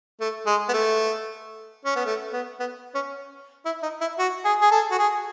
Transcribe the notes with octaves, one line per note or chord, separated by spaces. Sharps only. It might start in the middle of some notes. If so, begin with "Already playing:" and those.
A3
G#3
B3
A3
C#4
B3
A3
B3
B3
C#4
E4
D#4
E4
F#4
G#4
G#4
A4
F#4
G#4